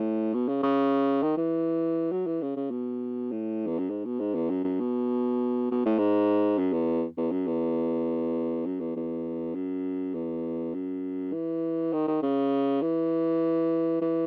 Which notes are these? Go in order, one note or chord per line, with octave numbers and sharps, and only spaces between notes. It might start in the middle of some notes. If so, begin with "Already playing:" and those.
Already playing: A2
B2
C#3
C#3
D#3
E3
F#3
E3
C#3
C#3
B2
A2
E2
F#2
G#2
B2
G#2
E2
F#2
F#2
B2
B2
A2
G#2
F#2
E2
E2
F#2
E2
F#2
E2
E2
F#2
E2
F#2
E3
D#3
D#3
C#3
E3
E3